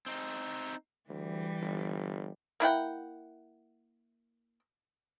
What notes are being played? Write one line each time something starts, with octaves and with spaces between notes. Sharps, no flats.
C4 D#4
D2 E3 G3
G1
A#3 E4 F#5 G5